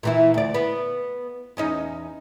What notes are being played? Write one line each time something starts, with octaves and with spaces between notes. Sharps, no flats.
A#2 E3 E4
D2 D5
B3
E2 C#4 D#4